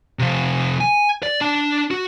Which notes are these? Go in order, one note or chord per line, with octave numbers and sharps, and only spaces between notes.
C3 F3
G#5
D5
D4 A5
F#4